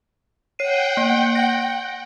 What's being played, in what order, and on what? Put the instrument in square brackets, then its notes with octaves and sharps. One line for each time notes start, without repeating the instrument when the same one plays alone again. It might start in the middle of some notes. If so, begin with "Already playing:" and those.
[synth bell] C#5 C7 D#7 [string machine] F#5 G5
[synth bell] A#3
A#6